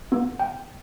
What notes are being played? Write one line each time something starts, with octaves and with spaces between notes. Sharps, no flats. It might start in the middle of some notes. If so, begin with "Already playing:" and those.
B3
G5